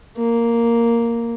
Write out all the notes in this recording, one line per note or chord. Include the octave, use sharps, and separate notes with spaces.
A#3